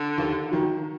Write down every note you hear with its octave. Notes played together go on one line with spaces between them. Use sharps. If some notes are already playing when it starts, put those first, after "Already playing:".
Already playing: D3
D#2
D#3 F#3